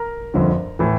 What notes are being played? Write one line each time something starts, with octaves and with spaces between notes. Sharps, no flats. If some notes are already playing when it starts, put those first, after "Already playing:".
Already playing: A#4 A#5
G1 F2 D3 F3
A2 E3